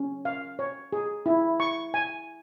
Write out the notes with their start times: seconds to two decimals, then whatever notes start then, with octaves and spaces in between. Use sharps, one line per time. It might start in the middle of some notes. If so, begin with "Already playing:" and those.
Already playing: C#4
0.25 F5
0.59 C#5
0.92 G#4
1.26 E4
1.60 C#6
1.94 G#5